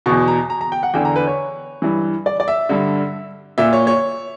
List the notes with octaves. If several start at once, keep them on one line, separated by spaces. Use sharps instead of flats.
E2 B2 C#6
A#5
A#5
A#5
G5
F#5
E2 D3 G5
A#5
B4
C#5
G2 E3
D5
D5
E5
G2 D3
A#2 E5
C#5
C#5